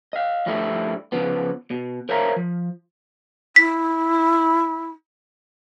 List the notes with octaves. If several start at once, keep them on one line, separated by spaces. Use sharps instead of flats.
D#5 F5
G2 F3 G3 A3 E4
C#3 F3 B3
B2
A#4 C5 C#5 E5 F5 A#5
F3
E4 B6